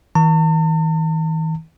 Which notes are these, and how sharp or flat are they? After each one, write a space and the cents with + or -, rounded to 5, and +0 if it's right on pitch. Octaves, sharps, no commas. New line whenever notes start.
E3 -45 A5 +45